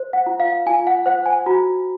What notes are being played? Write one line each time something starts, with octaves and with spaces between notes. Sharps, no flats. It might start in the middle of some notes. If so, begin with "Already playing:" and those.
Already playing: C5
F#5
F4
F5
F4 G#5
F#5
C5 F#5
G#5
F#4 A#5